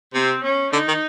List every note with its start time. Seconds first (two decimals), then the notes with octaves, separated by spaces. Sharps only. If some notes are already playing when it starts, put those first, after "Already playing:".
0.14 C3 C4
0.43 C#4
0.73 D3 D#4
0.88 D#3